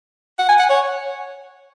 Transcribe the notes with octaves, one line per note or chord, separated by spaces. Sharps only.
F#5
G#5
F#5
C#5